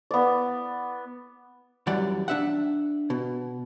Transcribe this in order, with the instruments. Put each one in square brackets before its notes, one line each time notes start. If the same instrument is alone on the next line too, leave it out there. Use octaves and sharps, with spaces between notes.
[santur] B3 D5
[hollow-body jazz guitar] F#2 E3 G3 D5 F#5
D4 E5 F#5
B2